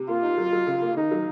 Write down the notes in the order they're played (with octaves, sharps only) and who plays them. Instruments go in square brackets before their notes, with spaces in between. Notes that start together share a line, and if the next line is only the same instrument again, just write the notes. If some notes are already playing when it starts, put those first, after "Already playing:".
Already playing: [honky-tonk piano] C3
[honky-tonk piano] A#3 [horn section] F4
[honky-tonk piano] D#4
F#3
F#3
C#3
A#3
[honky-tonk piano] D#3 [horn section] D#4
[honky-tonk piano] F#3